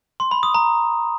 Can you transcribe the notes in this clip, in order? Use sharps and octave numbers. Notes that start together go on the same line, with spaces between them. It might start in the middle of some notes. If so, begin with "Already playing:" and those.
C6
B5
D#6
A#5